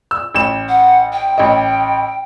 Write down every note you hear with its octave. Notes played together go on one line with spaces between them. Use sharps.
E6
A1 E7
F#5
G5
A1 D#5